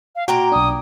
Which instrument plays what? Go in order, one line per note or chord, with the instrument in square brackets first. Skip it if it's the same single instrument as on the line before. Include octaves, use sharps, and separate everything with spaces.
[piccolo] F5
[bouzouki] A#2 A#3 G5 [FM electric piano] F#4 [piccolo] A#5
[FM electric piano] B1 D4 [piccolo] D#6